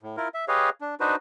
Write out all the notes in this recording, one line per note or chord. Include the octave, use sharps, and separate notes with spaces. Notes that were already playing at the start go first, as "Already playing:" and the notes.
A2
E4 F4 A#4
E5
G4 G#4 B4 C#5 D#5 F5
D4
D4 D#4 F#4 B4 C5